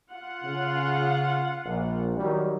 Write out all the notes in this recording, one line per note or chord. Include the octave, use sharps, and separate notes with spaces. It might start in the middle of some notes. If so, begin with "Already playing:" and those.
F4 F#5
C#3
A#1
D#3 F#3 G3